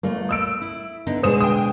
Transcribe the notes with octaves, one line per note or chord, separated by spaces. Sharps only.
G1 A3 A#3
D#6 E6 D7
E4
D3 B3 D#4
B2 D3 G#3 C5 D#6 E7
G5 D#6